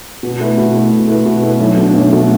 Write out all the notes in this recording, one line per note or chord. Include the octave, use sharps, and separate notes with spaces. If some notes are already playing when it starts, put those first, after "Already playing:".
B2
A3 E4 B4
B2
A3 E4 B4
B2
A3 E4 B4
B2
A3 E4 B4
B1
B2 A3 D4
B1
B2 A3 D4